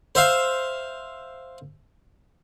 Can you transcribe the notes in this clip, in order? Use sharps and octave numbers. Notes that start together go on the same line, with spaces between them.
C5 E5 F5